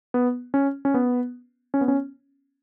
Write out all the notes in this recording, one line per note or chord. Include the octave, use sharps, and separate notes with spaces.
B3
C#4
C#4
B3
C#4
B3
C#4